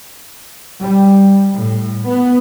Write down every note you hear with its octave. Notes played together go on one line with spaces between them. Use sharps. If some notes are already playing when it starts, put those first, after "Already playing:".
G3
A2
B3